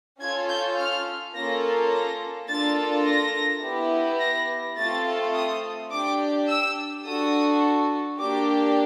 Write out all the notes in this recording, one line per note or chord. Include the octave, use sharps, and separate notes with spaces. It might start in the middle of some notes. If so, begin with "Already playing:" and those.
C#4 F4 A4 G#6
G6
F6
A#3 C#4 F4 A4 A#6
A#6
A#3 D4 F4 A4 A6
A#6
B3 E4 G4
A#6
A3 C4 F4 A4 A6
D#6
D4 G4 D6
E6
D4 F#4 A4 D#6
A#3 D4 G4 D6